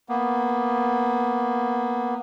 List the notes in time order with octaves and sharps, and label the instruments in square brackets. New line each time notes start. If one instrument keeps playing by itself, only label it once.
[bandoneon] A#3 B3